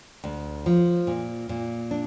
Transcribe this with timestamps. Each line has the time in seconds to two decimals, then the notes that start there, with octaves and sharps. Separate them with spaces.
0.24 D2
0.66 F3
1.07 A#2
1.49 A#2
1.91 D4